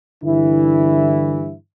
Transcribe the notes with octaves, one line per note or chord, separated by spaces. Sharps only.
G2 D3 E3 E4